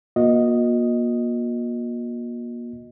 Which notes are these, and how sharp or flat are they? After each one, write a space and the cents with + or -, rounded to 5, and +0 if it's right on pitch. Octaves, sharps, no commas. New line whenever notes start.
A#3 +35 F#4 -45 D#5 +0